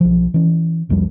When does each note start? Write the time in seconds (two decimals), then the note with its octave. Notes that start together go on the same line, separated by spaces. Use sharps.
0.01 B1 F3
0.34 E3 C#4
0.89 C2 F2 F3 G3